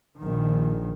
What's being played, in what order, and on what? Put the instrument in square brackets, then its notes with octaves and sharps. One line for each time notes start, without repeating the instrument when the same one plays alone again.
[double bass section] A#1 D#3